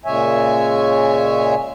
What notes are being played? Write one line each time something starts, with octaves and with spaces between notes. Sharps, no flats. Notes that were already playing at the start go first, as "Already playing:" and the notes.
A#2 C#3 G#3 C#5 E5 G#5